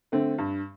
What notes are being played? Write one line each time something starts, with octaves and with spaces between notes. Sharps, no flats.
D3 A3 C4
G2